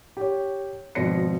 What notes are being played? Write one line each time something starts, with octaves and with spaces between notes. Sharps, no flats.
G4 C#5
G#1 B2 F3 C5 A#6 C#7